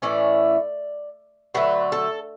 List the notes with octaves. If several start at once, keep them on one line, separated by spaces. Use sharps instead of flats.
A2 E3 A3 C#4 D5
D3 F#3 A3 B4
A4